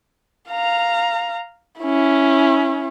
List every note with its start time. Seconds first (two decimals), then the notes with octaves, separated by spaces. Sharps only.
0.51 F5 A#5
1.82 C#4 E4